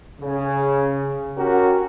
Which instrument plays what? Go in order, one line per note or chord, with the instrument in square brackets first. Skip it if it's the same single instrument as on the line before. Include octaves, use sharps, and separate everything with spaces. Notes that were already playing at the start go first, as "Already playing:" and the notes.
[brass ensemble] C#3
C#4 F#4 G4 A#4